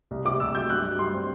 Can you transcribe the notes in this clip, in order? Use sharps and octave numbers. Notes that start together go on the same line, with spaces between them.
C2
C3 D6
C2 E6
F#3 G6
G2 F#6
F#3
G2 C6
C4